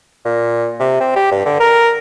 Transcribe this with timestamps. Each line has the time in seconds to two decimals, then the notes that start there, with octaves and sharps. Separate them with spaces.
0.25 A#2
0.80 C3
1.00 C4
1.16 G4
1.31 G2
1.46 D3
1.60 A#4